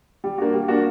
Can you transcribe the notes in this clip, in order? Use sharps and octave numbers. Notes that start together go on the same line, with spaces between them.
G3
A#3 D4 F#4
G3
A#3 D4 F#4